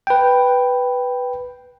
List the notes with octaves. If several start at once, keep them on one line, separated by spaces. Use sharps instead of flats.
B4 G5